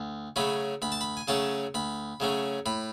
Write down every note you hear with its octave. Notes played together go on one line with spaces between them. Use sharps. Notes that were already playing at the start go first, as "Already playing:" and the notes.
Already playing: D2
C#3 F#3 A3 C#4 B5
D2 B5
A5
B5
G#5
C#3 F#3 A3 C#4 A5
D2 B5
C#3 F#3 A3 C#4
A2 B5